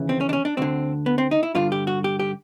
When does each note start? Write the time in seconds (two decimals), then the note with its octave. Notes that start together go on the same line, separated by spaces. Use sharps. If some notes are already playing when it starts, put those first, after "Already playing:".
Already playing: D#2 C#3 E3
0.09 C4
0.21 C#4
0.29 D4
0.33 C#4
0.45 D4
0.57 D2 D3 C4
1.06 B3
1.18 C4
1.31 D#4
1.43 E4
1.55 G2 D3 F4
1.72 G4
1.87 F#4
2.04 G4
2.19 G4